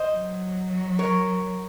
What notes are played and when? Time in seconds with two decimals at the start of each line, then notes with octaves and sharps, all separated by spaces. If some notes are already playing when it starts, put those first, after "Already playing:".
Already playing: C5 D#5
0.12 F#3
0.99 A#4 C#5